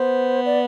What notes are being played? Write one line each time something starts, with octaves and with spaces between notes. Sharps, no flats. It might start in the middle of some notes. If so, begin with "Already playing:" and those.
Already playing: B3 C5
D5